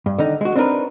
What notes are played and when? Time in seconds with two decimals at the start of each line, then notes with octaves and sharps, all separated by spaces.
0.06 G2
0.18 D3 D#3 D#4
0.41 G#3 F#4
0.55 C4 D4 D#4 F4 A#4 B4